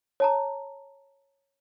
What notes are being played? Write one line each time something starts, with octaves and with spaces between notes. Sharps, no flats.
C#5 A5 A#5